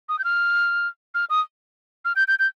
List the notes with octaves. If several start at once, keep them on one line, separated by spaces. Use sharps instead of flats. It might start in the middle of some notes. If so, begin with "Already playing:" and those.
D#6
G6
F6
F6
D#6
F6
G6
G6
G6